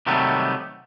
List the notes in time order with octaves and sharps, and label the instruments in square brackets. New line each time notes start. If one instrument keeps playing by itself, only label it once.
[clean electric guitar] C3 D#3 F#3 G3 A3 B3